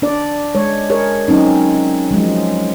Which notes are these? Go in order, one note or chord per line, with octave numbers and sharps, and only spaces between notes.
D4 D5
G#3 C#5
G#4 A#4 C#5
F#3 C4 C#4 D#4
F3 F#3 G#3